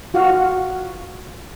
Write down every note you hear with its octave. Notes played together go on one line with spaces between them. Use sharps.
F4 F#4 F5